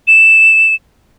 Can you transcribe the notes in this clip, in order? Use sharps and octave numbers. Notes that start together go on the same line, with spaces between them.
E7